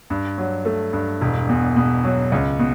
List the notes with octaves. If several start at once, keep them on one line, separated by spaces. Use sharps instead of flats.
G2
F#3
A3
G2
E1
E2
B2
F#3
C#2
B2